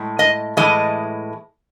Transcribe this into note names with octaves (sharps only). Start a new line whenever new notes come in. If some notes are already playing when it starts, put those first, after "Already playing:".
Already playing: A2 G#3
D#5
A2 E3 G#3 D#5